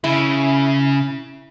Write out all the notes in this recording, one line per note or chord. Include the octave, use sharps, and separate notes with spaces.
C#3 E4